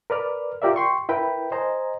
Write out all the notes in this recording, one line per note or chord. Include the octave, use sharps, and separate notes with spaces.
A#4 B4 D5 F6
F4 G4 A#4 D5 E5
G5 C6 C#6
E4 A#4 B4 G5 B5
C5 D#5 G#5 A#5